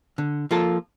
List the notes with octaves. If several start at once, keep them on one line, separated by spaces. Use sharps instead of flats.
D3
F3 A#3 F4 A4